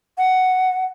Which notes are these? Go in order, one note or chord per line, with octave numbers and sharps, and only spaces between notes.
F#5